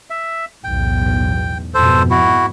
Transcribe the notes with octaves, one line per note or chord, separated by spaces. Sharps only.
E5
B1 E2 A2 G5
F2 G#2 B2 A4 C5
E4 F#4